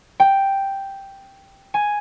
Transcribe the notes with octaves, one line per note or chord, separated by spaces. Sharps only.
G5
G#5